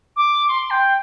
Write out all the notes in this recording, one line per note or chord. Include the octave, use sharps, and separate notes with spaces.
D6
C6
G5